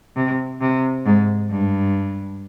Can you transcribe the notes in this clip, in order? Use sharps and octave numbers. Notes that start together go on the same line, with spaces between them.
C3
C3
G#2
G2